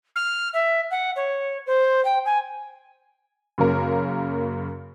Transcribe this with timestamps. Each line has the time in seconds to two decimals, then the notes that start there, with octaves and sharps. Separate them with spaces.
0.15 F6
0.53 E5
0.91 F#5
1.16 C#5
1.66 C5
2.05 G5
2.25 G#5
3.58 F#2 C#3 A#3 A#4